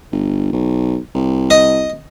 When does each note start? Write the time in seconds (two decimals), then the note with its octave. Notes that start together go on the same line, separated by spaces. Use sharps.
0.12 G1
0.53 B1
1.15 C2
1.50 D#5